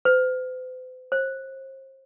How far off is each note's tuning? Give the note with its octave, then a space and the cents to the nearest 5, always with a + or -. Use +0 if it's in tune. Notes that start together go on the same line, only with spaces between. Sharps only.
C5 -45
C5 +35